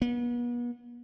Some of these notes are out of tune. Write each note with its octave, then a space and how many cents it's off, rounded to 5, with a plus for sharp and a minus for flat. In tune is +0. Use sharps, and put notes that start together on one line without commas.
B3 -40